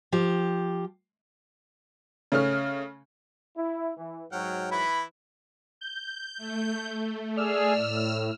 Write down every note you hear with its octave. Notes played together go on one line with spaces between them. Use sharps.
F3 G4
C#3 A3 C#4 F6
E4
E3
G#2 F#3 F#5 G5 F6
E3 E4 B4 B5
G6
A3
G#4 D5 E6 F6
A2